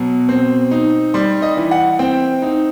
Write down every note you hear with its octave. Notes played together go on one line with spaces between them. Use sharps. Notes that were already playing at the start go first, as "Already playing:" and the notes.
Already playing: B2 F#3
C4
D#4
G3 C6
D#5
E3
F#5
C4 G5
D#4